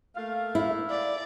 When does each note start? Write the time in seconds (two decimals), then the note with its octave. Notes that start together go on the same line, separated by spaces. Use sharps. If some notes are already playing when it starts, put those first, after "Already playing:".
0.16 A3 A#3 F5
0.55 E4
0.90 D5